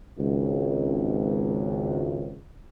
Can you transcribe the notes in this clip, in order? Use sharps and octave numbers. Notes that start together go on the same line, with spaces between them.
G#1 C#2